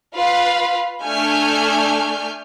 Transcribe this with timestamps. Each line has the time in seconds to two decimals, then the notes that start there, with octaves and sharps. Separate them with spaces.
0.15 F4 B4 F5
1.03 A3 D4 G#5 F6 G6